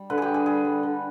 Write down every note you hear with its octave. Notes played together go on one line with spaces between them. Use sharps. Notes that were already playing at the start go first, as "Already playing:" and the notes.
Already playing: G3
D3 B4
G4 G#4
G3
G#4
G3 G#4
G3
D3